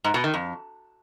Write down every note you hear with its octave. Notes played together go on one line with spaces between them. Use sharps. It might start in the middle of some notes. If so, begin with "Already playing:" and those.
G#2
B2
D#3
F2